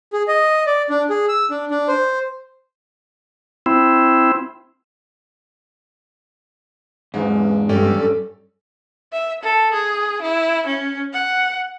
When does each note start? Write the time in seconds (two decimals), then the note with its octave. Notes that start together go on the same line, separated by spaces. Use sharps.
0.13 G#4
0.28 D#5
0.67 D5
0.90 D4
1.10 G#4
1.29 E6
1.51 D4
1.71 D4
1.88 C5
3.66 C4 E4
7.14 E2 G#2 G#3
7.69 G2 C#4 G4 A4 D5
9.13 E5
9.43 A4
9.73 G#4
10.22 E4
10.66 C#4
11.13 F#5